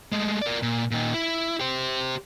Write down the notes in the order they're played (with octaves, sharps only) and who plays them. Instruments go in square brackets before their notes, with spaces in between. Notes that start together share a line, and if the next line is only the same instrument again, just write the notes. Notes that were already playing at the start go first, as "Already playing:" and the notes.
[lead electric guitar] G#3 A3
A#4 D5
A#2
A#2 D#3
E4
G4 C5